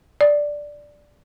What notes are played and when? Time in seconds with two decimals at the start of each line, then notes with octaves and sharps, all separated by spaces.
0.21 D5